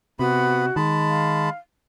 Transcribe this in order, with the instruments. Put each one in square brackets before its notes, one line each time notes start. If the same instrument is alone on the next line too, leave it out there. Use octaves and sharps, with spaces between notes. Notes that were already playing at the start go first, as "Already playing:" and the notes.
[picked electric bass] C3 [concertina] B3 B5 [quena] F#4
[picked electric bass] D#3 [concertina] G#3 A5 B5
[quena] F5